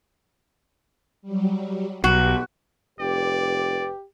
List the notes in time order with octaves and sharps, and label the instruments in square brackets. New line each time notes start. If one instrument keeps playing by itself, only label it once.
[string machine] F#3 G3
[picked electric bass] B1 [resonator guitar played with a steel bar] F#4 [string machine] G4
[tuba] F1 [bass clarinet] G4 [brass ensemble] B4 [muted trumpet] D5